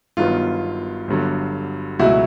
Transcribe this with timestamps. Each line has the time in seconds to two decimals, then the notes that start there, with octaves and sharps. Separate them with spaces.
0.17 G1 G2 D#3 F#3 B3 F4
1.08 G1 G2 D3 F#3
1.99 C#2 B2 F#3 A3 E4 F#4